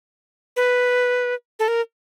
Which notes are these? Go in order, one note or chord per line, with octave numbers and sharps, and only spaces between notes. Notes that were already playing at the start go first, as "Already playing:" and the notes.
B4
A4
A#4